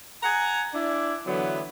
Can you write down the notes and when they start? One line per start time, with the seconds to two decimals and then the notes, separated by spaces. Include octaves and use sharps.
0.23 F#5 G#5 A#5
0.74 D4 E4 D5
1.27 D3 E3 F#3 B3